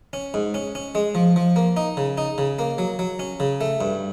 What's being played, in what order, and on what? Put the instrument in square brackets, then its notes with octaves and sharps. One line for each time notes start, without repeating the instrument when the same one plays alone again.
[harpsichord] C#4
G#2
C#4
C#4
G#3
F3
F3
A#3
D#4
C#3
D#4
C#3
A#3
F#3
F#3
C#4
C#3
A3
G2